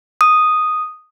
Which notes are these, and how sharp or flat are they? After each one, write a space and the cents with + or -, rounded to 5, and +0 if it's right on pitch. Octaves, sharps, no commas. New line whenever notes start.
D#6 -5